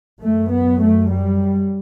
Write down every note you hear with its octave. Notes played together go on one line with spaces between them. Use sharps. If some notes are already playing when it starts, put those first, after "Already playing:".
F#2 A3
B3
A3
G3